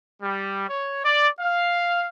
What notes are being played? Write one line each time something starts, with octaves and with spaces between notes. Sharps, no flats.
G3
C#5
D5
F5